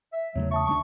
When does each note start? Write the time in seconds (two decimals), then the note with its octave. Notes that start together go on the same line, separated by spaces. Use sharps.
0.13 E5
0.35 E2 C#3 F#3 A3
0.51 E5 A5 C#6 D#6
0.67 D2 G#3 D4 C#6